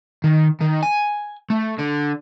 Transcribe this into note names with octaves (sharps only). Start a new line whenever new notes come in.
D#3
D#3
G#5
A3
D3